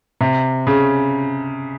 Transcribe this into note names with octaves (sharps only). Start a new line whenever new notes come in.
C3
C#3